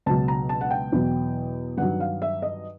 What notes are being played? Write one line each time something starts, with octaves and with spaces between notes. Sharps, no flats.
C#2 B2 F#3 A5
A#5
A5
F#5
G5
E2 B2 F#3
G2 D#3 F#3 F#5
F5
E5
D#5